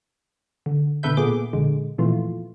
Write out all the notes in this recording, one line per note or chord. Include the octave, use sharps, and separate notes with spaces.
D3
B2 D3 A4 B4 E5 G6
A#2 A3 B3 G#4 D6
A#1 D3 G#3
F2 A#2 E3 A3 F4